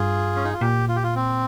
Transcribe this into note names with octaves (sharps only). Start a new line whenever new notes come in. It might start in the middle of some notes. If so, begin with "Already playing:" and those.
Already playing: G2 F4 G#4
C#4
D#4
F4
A#2 G4
F4
G4
F4
C4